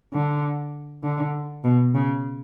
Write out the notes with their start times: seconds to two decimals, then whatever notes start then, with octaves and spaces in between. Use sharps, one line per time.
0.14 D3
1.03 D3
1.64 B2
1.95 C#3